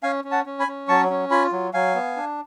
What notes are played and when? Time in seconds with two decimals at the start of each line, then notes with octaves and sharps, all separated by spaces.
0.03 C#4 F5 G#5
0.24 C#4
0.31 F#5 A5
0.46 C#4
0.60 G#5 B5
0.67 C#4
0.88 F#3 A5 C#6
1.10 C#4
1.31 F4 G#5 B5
1.52 F#3
1.73 F#3 F5 G#5
1.95 B3
2.16 D4